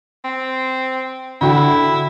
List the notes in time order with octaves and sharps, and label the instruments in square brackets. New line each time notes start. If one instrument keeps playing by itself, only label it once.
[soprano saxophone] C4
[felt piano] D3 F#4 G5 [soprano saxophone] E4